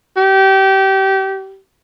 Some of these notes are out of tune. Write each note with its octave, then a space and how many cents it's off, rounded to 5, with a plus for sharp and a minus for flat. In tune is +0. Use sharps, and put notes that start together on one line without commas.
G4 -25